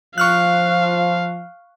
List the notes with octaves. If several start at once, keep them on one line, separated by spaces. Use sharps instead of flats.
F3 F5 C#6 F6 F#6